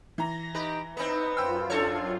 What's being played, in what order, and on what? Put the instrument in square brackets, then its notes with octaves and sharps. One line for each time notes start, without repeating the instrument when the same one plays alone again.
[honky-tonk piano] E3 A#5 [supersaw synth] A#6
[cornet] D#4 [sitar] G4 B4
[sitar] B3 C4 [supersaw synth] D#4 [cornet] B4
[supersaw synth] F#2 F4 [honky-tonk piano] C5 G5 E6
[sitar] D4 A4 C#5